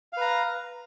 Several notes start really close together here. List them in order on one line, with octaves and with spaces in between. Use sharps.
F5 B4 A#5